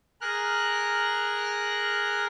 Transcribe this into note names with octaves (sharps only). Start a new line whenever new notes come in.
G#4 A#4 F6 F#6